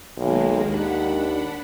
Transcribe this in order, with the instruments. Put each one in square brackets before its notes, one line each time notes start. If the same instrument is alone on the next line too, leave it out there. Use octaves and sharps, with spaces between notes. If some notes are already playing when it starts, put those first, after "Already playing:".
[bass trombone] B1 [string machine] D#3 G#3 A#3
[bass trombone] D#2 [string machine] D4 F#5 B5